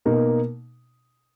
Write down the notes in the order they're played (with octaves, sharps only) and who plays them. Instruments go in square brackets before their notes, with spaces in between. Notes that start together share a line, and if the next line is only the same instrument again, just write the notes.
[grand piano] B2 A#3 D#4